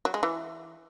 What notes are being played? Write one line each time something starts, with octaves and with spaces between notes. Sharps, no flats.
F#3
G#3
E3